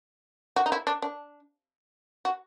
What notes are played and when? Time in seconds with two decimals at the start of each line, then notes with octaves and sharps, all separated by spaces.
0.56 F#4
0.66 D#4
0.72 E4
0.87 D4
1.02 D4
2.25 F#4